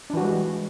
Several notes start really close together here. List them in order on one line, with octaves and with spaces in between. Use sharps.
D4 E3 F#4 G3 G#3